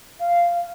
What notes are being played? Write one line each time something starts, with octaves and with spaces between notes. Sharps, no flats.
F5